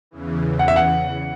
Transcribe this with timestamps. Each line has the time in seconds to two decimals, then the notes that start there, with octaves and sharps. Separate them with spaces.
0.11 E2 C#3 E3
0.59 F#5
0.68 E5
0.76 F#5